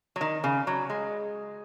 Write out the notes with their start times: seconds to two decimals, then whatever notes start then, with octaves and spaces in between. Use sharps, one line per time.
0.16 F#3
0.21 D#3
0.44 C#3
0.67 F#3
0.90 G#3